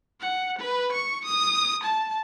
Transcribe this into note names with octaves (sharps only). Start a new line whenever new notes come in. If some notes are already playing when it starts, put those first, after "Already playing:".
F#5
B4
C#6
D#6
A5